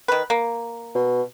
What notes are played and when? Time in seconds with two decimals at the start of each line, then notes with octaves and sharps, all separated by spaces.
0.08 D#3 B4
0.30 A#3
0.95 B2